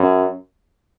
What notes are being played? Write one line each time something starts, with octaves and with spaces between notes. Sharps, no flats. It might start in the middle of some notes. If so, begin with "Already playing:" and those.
Already playing: F#2